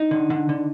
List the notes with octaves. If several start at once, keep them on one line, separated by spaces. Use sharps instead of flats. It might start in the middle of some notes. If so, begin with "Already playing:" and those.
Already playing: D#4
D3
D3
D3